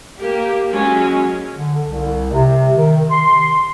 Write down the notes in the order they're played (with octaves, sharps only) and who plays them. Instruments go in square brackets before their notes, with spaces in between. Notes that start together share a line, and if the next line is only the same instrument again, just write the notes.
[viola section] A#3 G4
F#3 G#3 C#4
[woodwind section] D3
C2
C3
D#3
C6